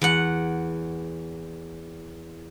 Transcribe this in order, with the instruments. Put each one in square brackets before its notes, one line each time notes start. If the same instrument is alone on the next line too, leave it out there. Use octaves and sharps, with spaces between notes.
[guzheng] E2 F#5